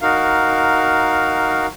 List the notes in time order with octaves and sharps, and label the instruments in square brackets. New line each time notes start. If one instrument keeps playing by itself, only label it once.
[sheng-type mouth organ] D#4 F#4 A#4 F5